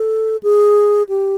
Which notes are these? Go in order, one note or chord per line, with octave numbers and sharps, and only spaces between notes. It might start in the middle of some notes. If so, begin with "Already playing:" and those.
Already playing: A4
G#4
G4